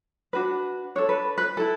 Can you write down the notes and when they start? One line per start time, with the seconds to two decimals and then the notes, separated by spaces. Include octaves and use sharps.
0.33 D4 F#4 B4
0.95 D4 A4 C#5
1.09 B4
1.38 B4
1.57 E4 A4